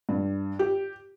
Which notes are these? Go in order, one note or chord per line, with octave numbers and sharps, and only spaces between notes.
G2
G4